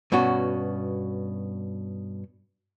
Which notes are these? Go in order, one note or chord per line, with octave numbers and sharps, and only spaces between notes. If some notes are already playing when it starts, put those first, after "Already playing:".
G2 B2 C#4 F#4